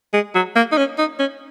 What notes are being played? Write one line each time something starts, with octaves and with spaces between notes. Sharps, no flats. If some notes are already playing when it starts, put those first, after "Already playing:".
G#3
F#3
A#3
D#4
C#4
D#4
C#4